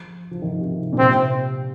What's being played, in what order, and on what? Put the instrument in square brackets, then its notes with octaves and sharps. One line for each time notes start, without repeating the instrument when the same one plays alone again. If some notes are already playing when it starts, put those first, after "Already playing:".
Already playing: [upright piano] F3
F3
D#3
C3
A#2
[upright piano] C3 [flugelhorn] C4